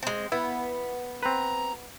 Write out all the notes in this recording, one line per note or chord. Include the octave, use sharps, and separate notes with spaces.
G#3 C4
B3 E4
C4 B4 A#5